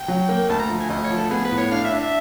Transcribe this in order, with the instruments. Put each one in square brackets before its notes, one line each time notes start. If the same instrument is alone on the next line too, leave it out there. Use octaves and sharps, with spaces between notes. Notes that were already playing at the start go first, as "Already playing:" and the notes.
Already playing: [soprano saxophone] G5
[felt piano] F#3
A#3
[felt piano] D2 [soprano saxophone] A5
[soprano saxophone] A#5
[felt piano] F3
[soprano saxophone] G#5
[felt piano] D2 [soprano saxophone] D#5
[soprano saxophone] C#5
[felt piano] F3
[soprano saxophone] A4
[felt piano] B3 [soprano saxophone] G#4
[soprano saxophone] B4
[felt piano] A2
[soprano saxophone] C#5
[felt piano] D4 [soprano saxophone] F5
[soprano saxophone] E5
[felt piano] D4
[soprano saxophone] E5